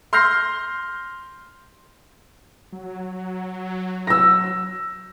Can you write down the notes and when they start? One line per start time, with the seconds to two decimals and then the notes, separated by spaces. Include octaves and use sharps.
0.13 C6 F6 G6 A#6 C7
2.72 F#3
4.07 E6 A#6